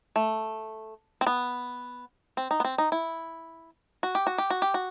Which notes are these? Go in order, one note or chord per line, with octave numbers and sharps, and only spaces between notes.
A3
C4
B3
C4
D#4
B3
C4
D#4
E4
F#4
G4
F#4
G4
F#4
G4
F#4